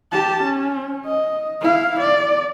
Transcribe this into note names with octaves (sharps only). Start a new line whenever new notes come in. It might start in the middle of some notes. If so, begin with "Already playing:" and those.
G4 A5
C#4
D#5
E4 F5
D5